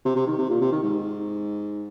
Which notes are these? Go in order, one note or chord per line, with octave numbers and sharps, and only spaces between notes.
C3
C3
D#3
C3
A#2
C3
D#3
G#2